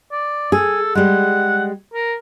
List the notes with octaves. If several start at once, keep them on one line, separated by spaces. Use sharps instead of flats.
D5
G#4 A4
G3 G#3 F#5
A#4